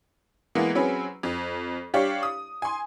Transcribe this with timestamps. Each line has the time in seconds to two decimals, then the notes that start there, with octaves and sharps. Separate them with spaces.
0.55 E3 G#3 A#3 B3
0.75 F#3 C4 C#4 G#4 B4
1.23 F2
1.94 G3 D4 G4 C#5 F5
2.23 D#6
2.62 G#5 C6